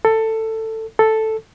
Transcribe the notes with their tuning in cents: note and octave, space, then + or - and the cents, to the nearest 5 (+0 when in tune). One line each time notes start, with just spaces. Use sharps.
A4 +15
A4 +0